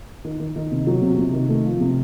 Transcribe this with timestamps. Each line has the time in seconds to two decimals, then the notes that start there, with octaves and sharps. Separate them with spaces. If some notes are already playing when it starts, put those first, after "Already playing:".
0.25 D#3
0.40 D#3
0.56 D#3
0.72 C3
0.87 F#3
1.02 C3
1.18 C3
1.33 D#3
1.49 A3
1.65 F3
1.80 C3